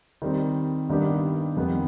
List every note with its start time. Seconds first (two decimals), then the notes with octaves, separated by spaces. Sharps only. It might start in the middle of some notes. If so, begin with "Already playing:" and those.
0.22 D#3 G3 C4
0.89 G2 D#3 B3 D4 G4
1.57 F2 D#3 G3 B3